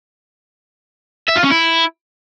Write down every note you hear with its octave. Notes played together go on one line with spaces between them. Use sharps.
E5
F4
C#4
E4